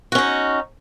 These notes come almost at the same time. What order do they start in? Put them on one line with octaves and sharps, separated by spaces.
F#4 C#4 D#4